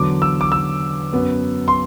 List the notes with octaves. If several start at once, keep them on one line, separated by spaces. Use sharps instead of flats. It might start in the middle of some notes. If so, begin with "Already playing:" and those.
Already playing: E2 D3 F#3 D6
E6
D6
E6
F#2 F#3 B3
C6